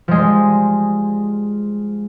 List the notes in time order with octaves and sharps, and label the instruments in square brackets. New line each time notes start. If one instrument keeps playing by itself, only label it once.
[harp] F3 G3 G#3